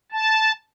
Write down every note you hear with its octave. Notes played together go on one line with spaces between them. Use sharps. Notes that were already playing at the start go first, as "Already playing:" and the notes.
A5